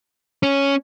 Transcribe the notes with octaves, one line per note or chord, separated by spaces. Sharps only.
C#4